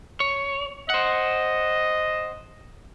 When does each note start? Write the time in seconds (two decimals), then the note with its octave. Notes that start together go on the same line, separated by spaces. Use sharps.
0.20 C#5
0.90 C5 D#5 F#5